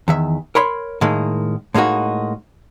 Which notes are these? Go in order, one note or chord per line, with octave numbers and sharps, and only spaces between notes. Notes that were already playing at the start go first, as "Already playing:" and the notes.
E2 D#3 E5
A#4 C#5 B5 C6
A2 D#3 G#3 A#3
A2 G#3 A#3 D#4 F#4